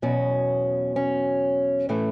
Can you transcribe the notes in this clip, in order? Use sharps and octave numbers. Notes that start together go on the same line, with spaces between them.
E2 B2 F#3 C#4
C#4
A2 E3 A3